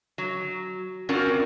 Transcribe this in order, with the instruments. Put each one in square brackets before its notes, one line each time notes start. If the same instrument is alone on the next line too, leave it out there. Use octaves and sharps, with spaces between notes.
[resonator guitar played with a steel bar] F#3
C4 C#4 F4 F#4 A#4 D5